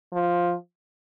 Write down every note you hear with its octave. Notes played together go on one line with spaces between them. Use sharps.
F3